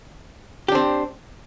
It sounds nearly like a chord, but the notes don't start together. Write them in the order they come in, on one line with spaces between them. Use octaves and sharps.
G4 D4 C4